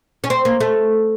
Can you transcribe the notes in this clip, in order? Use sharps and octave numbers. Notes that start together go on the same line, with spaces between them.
C#4
C4
A#3
A3